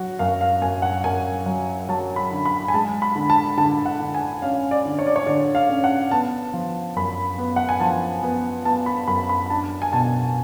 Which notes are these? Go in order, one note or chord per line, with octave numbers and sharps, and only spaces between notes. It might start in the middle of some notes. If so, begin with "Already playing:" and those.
Already playing: F#3 F#4
F#2 F5
F5
F#2 G#5
F#5
F#2 G#5
F#3
F#3 A5
B5
D3
B5
G#5
G#3 A5
B5
D3
A5
D3 A5
F#5
D3
G#5
C#4 F5
D5
D3
C#5
D5
C#5
D3 D5
F5
C#4
F#5
B3 A5
F3
F#2 B5
B3
F#5
G#5
F3 A5
B3
B3 A5
B5
F#2 B5
B5
D4 A5
G#5
B2 A5